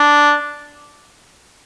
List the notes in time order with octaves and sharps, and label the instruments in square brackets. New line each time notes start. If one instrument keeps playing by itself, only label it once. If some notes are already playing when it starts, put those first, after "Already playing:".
Already playing: [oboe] D4